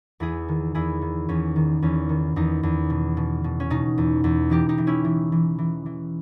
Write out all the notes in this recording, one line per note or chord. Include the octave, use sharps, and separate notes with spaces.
E2 E4 G#4
D#3
E2 E4 G#4
D#3
E2 C#4
D#3
E2 C#4
D#3
E2 D#4
E2
B2
B2
B2
C#4
B2 D#4
E2
E2
E3 D#4 G4
D#4 G4
E3
C#4 E4
E3
E3
E3
E3